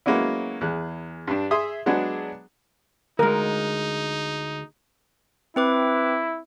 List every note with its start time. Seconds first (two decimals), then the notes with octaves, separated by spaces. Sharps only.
0.06 F#3 G#3 A#3 B3 C#4 E4
0.61 E2 G#4 F#6
1.27 G2 D4
1.51 G#4 E5 C6 D#6
1.86 F#3 G#3 B3 D4 G#4
3.19 D2 G#3 D#4 A#4
5.56 C4 E4 B4 D6